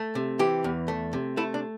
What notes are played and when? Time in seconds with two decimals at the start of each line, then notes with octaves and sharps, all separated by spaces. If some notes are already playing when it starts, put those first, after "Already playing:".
Already playing: A3
0.15 C3
0.39 E3 G4
0.64 E2
0.88 A3
1.13 C3
1.37 A3 E4
1.54 D4